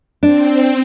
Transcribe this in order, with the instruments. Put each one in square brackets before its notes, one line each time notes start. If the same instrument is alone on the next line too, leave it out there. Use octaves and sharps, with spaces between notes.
[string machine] C4 [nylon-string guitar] D4